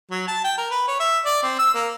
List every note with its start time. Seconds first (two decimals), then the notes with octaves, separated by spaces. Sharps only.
0.11 F#3
0.28 A5
0.44 G5
0.58 A#4
0.71 B4
0.88 C#5
1.00 E5
1.25 D5
1.43 C4
1.59 E6
1.74 A#3